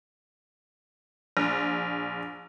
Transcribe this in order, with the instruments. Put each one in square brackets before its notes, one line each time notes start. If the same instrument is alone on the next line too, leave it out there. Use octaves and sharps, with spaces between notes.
[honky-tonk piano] A#1